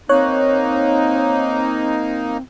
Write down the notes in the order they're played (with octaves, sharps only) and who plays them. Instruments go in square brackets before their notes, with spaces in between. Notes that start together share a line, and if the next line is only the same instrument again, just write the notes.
[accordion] A#3 D#4 [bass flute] C4 [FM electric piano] C#5 F#6